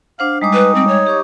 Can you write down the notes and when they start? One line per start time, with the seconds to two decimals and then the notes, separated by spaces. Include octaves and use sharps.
0.19 D4 C5 F5 F#5
0.42 G3 G#3 D#4 D6
0.54 B4
0.75 C4
0.88 C#5
1.07 G4 C#6 D6